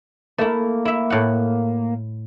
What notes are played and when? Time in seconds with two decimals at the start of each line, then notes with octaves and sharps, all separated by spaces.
0.38 A3 A#3 E4
0.85 E4 E5
1.10 A2 F#5